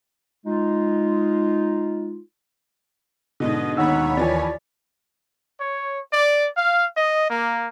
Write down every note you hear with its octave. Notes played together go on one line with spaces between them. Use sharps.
G#3 D#4 F4
G#2 B2 D3 D#5
D#2 D#4 C#5 F#5 B5 E6
E3 F3 D5 G#5
C#5
D5
F5
D#5
A#3